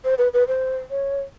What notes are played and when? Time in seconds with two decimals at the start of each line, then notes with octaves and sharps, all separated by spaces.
0.05 C5
0.18 B4
0.34 B4
0.48 C5
0.90 C#5